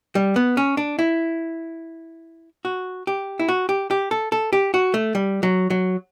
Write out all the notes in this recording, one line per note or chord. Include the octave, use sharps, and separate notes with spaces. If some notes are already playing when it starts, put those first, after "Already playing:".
G3
B3
C#4
D4
E4
F#4
G4
E4
F#4
G4
G4
A4
A4
G4
F#4
A3
G3
F#3
F#3